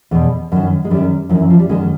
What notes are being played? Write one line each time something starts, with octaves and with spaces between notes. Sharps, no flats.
E2 B2
F#2 D#3
G#3
F#2 D#3 G3
F#2 D#3 F3
E3
F3
G3
F#2 D#3 G#3